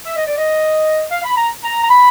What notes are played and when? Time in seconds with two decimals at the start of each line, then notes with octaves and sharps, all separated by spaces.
0.05 E5
0.16 D#5
0.27 D5
0.38 D#5
1.11 F5
1.24 B5
1.37 A#5
1.64 A#5
1.83 A#5
1.90 B5